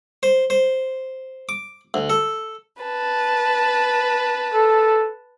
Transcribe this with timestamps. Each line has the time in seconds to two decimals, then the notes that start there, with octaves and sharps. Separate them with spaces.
0.23 C5
0.50 C5
1.49 D6
1.94 D2
2.10 A4
2.82 B4 A5
4.54 A4